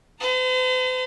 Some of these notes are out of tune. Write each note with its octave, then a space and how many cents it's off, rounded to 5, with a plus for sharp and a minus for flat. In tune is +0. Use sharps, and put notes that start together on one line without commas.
C5 -45 A#5 -30